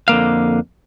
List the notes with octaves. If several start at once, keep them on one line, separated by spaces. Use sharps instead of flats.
F2 D3 A#3 F5